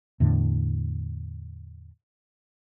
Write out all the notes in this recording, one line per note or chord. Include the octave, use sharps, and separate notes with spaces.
E2 A2 D3